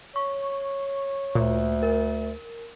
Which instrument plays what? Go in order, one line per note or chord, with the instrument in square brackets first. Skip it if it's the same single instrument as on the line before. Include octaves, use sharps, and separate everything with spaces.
[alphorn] C#5 [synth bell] C#6
[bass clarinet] D2 [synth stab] A#2
[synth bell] A#4